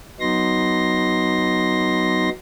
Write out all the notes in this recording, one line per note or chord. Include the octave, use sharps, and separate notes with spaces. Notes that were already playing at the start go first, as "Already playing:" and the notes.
F#3 B3 D#4 C6 A#6